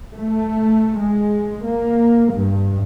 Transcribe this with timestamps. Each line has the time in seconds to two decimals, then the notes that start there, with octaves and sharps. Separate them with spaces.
0.14 A3
0.99 G#3
1.66 A#3
2.34 G2